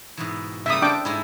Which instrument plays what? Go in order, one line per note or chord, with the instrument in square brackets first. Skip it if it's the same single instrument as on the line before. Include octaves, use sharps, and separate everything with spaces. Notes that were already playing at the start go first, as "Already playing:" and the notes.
[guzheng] G#2 B2 E3
[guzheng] C#3 G3 A#3 [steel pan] E5 D#6
[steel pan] D4 G5 D6 [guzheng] A4 C5
[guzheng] G#2 G#3 E4